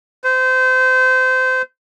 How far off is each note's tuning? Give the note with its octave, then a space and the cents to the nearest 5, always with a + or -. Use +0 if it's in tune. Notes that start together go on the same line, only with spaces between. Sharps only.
C5 -25